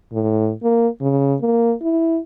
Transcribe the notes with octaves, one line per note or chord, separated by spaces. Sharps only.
A2
A#3
C#3
A#3
E4